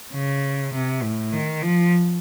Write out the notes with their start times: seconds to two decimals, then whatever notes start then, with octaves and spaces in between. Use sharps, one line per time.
0.13 C#3
0.74 C3
1.03 A2
1.33 D#3
1.62 F3